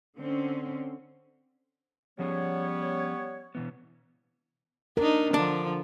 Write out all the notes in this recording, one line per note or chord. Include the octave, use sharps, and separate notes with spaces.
D3 C4 C#4
F3 G3 B3 C#4 G#4 C#5
B2 E3 B3
D4 D#4 A#4
D3 F3 D4